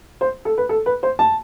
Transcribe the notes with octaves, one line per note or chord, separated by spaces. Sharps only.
C5
A4
B4
A4
B4
C5
A5